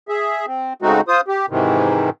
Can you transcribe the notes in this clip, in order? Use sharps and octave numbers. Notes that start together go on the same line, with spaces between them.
G#4 E5
C4
C#3 G#3 A3 C4 D#4 F#4
F4 C5 D#6
G4
G#2 C3 D#3 E3